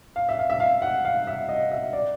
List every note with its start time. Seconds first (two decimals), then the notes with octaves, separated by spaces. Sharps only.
0.16 F5
0.29 E5
0.39 F5
0.50 E5
0.60 F5
0.82 F#5
1.05 F5
1.27 E5
1.49 D#5
1.71 E5
1.93 D5